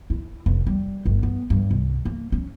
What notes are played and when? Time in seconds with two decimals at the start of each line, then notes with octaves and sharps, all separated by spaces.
0.10 E4
0.46 F1
0.67 G3
1.05 G1
1.23 B3
1.50 G2
1.71 C2
2.05 A#3
2.32 C#4